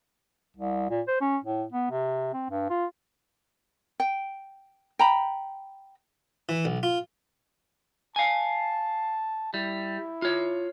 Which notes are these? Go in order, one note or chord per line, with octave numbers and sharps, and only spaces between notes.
C2
A#2
C5
C#4
A2
B3
C3
C4
G2
F4
G5
G5 A#5 B5
E3
B1
F4
F5 G#5 A5
G3 E4
F4 C#5